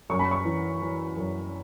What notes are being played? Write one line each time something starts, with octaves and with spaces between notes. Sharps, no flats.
F#2 C#6
B5
C#6
E3
E3
F#2